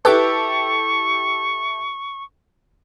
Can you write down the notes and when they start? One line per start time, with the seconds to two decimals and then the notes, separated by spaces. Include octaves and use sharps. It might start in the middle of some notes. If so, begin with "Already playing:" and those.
0.05 E4 G4 A4 B4 C#6 D6 G6